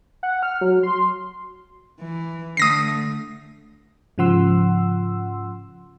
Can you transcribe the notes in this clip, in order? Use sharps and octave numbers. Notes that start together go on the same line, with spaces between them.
F#5
F6
F#3
C6
E3
D3 A3 D#6 A#6 C7
G#2 C#3 F3 F#5 C6 E6